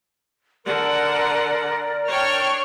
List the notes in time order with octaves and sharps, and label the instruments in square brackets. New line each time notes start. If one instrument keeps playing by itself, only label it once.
[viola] D3 F#5 [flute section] A#4 D5
[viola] D4 C#5 [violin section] G5 C#6 F6